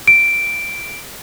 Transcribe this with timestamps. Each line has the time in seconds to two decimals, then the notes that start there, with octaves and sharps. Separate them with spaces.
0.08 D7